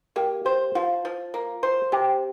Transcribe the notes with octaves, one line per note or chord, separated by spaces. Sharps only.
A#3 G4
G4 C5
F3 F4
F3
A#3
C5
C3 G4